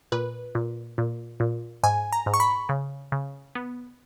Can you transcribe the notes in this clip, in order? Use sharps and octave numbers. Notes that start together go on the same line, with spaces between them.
A#2 B4
A#2
A#2
A#2
G#2 G#5
A#5
G#2
C#6
B5
C#3
C#3
B3